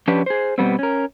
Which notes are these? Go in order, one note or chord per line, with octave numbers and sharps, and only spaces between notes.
F3 C#4 D4 G4 B4
G#4 C5
B2 D3 G3 B3 C4
C#4 A#4